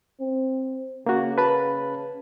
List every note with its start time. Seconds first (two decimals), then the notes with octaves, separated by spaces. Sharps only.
0.20 C4
1.06 C#3 A#3 F#4
1.38 B4 A5 B5